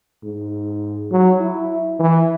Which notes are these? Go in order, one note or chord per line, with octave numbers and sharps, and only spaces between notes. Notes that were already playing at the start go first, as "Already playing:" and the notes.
G#2
F#3
E4
E3